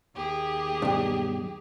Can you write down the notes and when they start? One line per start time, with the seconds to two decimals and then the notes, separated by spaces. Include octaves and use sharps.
0.14 D#2 G4 G#4
0.82 B1 G2